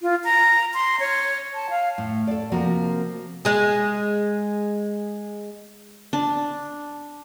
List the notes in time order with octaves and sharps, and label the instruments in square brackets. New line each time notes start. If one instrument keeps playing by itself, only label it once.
[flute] F4
A#5
C6
C#5
A5
F5
[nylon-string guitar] A2
A4 D5
C3 F3 A#3 C4 F#4 A#4
[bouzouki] G#3 G#4
[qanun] D4